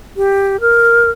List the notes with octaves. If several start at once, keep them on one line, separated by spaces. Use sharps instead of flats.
G4
A#4